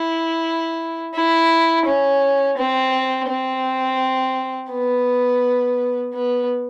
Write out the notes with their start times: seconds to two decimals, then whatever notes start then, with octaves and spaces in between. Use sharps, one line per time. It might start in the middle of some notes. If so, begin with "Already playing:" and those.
Already playing: E4
1.14 E4
1.86 C#4
2.58 C4
3.28 C4
4.71 B3
6.14 B3